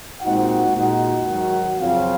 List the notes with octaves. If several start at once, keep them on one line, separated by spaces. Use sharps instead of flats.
A#2 G#3 C4 D#4 F#4 F#5
A#2 G#3 D#4 F#4 F#5
G#2 D#3 F#3
F#2 C#3 F3 C4 F4 F5